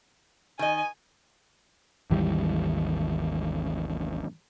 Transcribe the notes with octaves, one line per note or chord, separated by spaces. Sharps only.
D#3 D#5 G#5
G#1 D#2 E3 G3